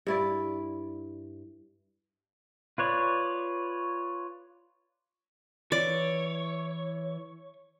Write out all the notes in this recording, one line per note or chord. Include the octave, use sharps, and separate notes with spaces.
G2 E4 D5
F4 B4 C#5 D5
E3 C#5 D5